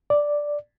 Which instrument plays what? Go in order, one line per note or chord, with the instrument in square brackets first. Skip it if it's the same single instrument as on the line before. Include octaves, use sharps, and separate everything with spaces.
[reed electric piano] D5